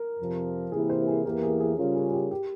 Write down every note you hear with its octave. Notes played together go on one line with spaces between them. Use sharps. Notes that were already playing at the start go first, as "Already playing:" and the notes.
Already playing: A#4
F2 C3 F3
C3 E3 A#3 E4 G4 G#4
C5
G#4
E2 E3 A#3 E4 G4 A#4
G#4
G#4
C#3 G3 C#4 F4 A#4
G#4
G#4
G4
G4